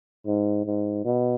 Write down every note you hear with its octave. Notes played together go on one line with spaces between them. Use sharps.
G#2
G#2
B2